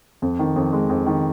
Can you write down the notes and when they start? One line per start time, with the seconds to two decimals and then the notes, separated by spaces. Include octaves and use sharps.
0.22 F2
0.39 D#3
0.56 F2
0.73 G#3
0.89 F2
1.07 D#3